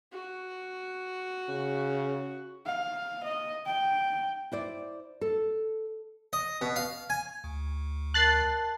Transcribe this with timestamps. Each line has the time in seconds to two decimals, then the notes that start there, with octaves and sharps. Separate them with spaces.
0.12 F#4
1.49 C#3
2.66 F5
3.24 D#5
3.66 G5
4.52 E4 C5 D5
5.21 A4
6.33 D#5
6.61 B2
6.76 F5
7.10 G#5
7.44 D2
8.14 A#4 A5 F#6 A6 C7